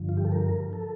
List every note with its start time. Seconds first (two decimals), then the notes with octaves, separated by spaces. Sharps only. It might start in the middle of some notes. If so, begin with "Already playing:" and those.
Already playing: G2 D3 F3
0.09 F4
0.17 G4
0.25 A4
0.32 A#4
0.73 A4